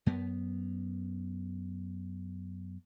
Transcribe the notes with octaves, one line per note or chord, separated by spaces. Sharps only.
F#2 B3